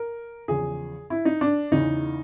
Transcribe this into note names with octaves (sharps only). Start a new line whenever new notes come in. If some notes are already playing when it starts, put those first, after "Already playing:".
Already playing: A#4
E2 C#3 F3 G#4
E4
D#4
D4
E2 C#3 E3 D#4